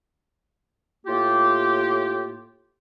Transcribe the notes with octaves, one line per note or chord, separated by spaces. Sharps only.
A2 A#3 F4 G4